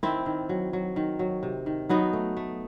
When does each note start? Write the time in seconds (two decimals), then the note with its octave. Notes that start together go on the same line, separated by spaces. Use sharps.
0.03 D#3 C4 E4
0.26 D#3
0.49 F#3
0.73 F#3
0.96 D#3
1.19 F#3
1.43 C3
1.66 D#3
1.89 F#3 B3 D#4
2.13 A3
2.37 A3